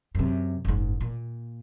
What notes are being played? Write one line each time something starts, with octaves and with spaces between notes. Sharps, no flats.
F#2 C3
F#1 G#2
A#2